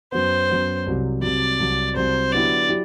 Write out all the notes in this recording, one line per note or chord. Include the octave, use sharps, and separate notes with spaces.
F#2 F#3 B3 C5
F#2 F#3 B3
C2 C3 F#3
C2 C3 F#3 D5
C2 C3 F#3
C2 C3 F#3 C5
D3 F#3 B3 E4 G4 D5
F#3 E4 G4